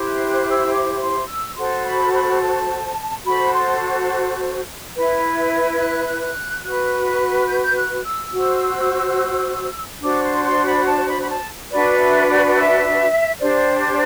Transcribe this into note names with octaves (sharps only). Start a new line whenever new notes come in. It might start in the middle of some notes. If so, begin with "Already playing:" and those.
Already playing: E4 G4 C5
F#6
F#6
E6
D6
C6
E6
F#4 A4 C5 C6
B5
B5
A5
F#4 A4 C5 B5
C6
E4 B4
F#6
F#6
F#4 B4 F#6
F#6
G6
G6
F#6
E6
F#4 C5
D4 F#4 C5 D6
C6
C6
B5
A5
B5
B5
A5
D4 F#4 B4 D5
E5
D5
E5
D4 G4 C5 D5